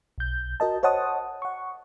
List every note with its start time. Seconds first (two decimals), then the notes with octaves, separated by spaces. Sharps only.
0.18 B1 G6
0.60 F#4 A#4 D#5 A5
0.83 C5 C#5 D#5 F#5 A5 D#6
1.42 F#5 C#6